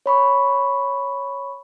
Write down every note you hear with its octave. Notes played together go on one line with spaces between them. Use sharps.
C#5 B5 C#6